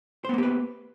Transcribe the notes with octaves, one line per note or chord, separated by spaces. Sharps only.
A#3 B3 G4 B4 C5